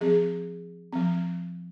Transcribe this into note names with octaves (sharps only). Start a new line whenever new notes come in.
F3 C4 G#4
F3 C4